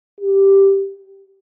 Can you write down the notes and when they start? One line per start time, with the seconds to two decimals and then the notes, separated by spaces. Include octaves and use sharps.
0.20 G4